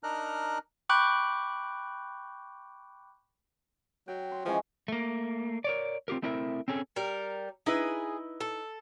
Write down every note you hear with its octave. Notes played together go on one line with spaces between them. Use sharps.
D4 D#4 A#4 A#5 F6 F#6
G5 B5 C#6 D6 F#6 G6
F#3 G5
C6
E3 F3 G#3 C#4
A3 A#3
A#4 C#5 D5
C4 F4 G4 A#4
A3 C4 D4 E4 A#4 E5
C4 C#4 G#4 A4
G3 A#4
D#4 E4 G#4 B4
A4